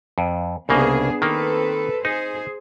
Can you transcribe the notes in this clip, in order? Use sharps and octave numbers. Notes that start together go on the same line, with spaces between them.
F2
C2 C#3 A#3 B3 D4 G#4
D#3 A#3 C4 A4 B4
D#4 G#4 C5